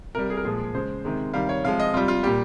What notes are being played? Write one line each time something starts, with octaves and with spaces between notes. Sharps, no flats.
C3 G3 A#4
G#4
A#4
A#2 F3 G#3 G#4
C#3 G#3 C5
C3 D#3 G#3
C3 D#3 G3 F5
C#5
C3 F3 G#3 F5
D#5
C3 G3 F4
F4
A#2 G3 G4